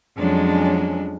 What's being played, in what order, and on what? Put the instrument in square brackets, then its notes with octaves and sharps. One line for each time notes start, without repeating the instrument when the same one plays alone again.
[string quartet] F2 F3 F#3 G#3 C#4 D4